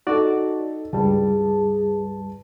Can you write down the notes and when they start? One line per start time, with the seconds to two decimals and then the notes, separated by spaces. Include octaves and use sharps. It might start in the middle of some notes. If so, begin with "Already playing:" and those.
0.07 D#4 F#4 A4 D5
0.93 C#2 G2 G3 G#4 B4 A5